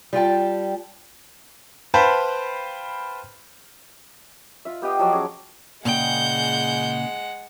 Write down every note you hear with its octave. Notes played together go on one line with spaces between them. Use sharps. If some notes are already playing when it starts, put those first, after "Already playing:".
G3 F4 G5 A5
B4 C5 F5 G5 A5 B5
F4 E5
B3 G4 D#5 G5
F3 F#3 D5 D6
C#4 G#4 D6
A#2 C#3 G#3 F#5 G5 G6